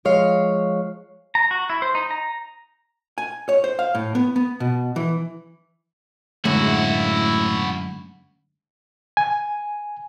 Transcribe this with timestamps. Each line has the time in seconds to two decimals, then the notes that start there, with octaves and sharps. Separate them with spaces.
0.05 F3 G#3 C#5 F5
1.35 A#5
1.51 F#4
1.70 E4
1.82 C5
1.95 D#4
2.11 A#5
3.18 G#5
3.49 C#5
3.64 C5
3.79 F5
3.95 A2
4.15 B3
4.36 B3
4.60 B2
4.96 E3
6.45 F#2 A2 D3 G#3 A3 E4 F#4
9.17 G#5